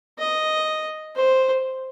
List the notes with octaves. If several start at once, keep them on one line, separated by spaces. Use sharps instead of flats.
D#5
C5